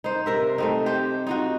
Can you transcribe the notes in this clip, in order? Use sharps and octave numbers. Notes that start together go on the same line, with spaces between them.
D#4 C5
C3 A#4 E5
A3 C4 D#4
G4 C5
D#4 F4 F#4